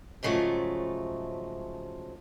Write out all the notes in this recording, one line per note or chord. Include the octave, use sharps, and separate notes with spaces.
G#2 C#3 F3 F#3 A3